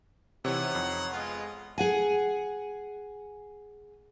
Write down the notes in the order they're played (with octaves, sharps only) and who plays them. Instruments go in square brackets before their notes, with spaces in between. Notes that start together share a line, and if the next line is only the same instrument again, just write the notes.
[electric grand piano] C3 E3 [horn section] D#4 C#5 F#5
[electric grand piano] F2
[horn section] G#3 B3 F4
[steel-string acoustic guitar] G#4 F#5 G#5